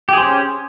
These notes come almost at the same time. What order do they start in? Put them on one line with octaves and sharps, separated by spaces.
G4 G#4 C5 C#4